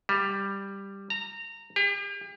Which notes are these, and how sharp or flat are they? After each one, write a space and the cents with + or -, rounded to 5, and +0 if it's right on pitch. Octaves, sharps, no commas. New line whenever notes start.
G3 +5
A#5 -20
G4 +40